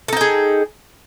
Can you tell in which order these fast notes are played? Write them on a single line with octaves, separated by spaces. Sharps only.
A4 D#4 G5 G#4